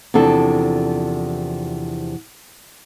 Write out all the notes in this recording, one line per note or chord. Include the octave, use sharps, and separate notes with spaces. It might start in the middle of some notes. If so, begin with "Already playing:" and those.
E2 C3 F3 D4 A4